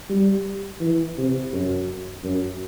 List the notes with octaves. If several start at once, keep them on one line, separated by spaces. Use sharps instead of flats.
G3
E3
C3
F#2
F#2